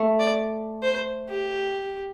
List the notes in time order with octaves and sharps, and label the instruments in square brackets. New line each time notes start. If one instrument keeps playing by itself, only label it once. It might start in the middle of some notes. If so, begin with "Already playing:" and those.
Already playing: [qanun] A3
[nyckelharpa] D5
C5
G4